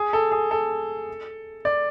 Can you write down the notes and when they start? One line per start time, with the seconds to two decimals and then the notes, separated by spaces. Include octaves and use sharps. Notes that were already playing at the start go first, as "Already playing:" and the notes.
Already playing: G#4
0.13 A4
0.32 G#4
0.51 A4
1.65 D5